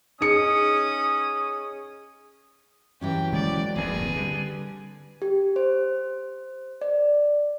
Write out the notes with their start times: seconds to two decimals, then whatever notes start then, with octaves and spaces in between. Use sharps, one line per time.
0.21 C#4 D#4 G#4 D#6 C#7
3.01 E3 F#3 C#4 G4 G5
3.33 D#3 G#3 A3 D5
3.76 D1 A#1 G2 C4 G#4 B4
4.16 D3 G3
5.22 G4
5.56 C5
6.81 D5